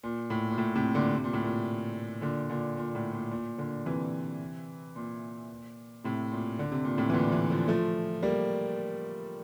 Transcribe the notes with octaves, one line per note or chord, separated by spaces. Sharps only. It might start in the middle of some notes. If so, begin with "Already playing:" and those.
A#2
A2
A#2
A2
A2 C3
A#2 D3
C3
A#2
A2
A#2
A#2 D3
A#2 D3
A#2
A2
A#2
A#2
A#2 D3
C3 E3
A#2
A2 C3
A#2
D3
C3
A#2
A2 C3
E3
A#2 D3
C3 E3
D3 F3
F3 A3
G3 A#3